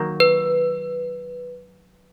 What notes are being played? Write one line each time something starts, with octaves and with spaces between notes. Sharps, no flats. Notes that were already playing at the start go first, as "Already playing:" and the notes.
Already playing: D#3 F#3 A#3 D#4
B4